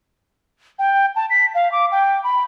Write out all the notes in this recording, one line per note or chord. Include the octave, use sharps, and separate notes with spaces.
G5
A5
B6
F5
D6
G5
B5